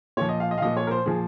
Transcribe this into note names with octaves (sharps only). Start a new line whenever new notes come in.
A#2 F3 C#5
D#5
F5
D#5
F5
A#2 F3 D#5
C#5
A#4
C5
A#2 F3 G#4